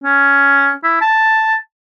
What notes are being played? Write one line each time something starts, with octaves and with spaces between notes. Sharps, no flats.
C#4
E4
A5